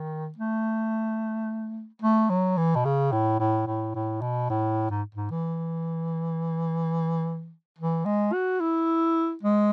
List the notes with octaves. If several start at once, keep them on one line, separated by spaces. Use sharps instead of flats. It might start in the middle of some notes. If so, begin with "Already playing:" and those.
Already playing: D#3
A3
A3
F#3
E3
B2
C#3
A2
A2
A2
A2
B2
A2
G#2
G#2
E3
E3
G#3
F#4
E4
G#3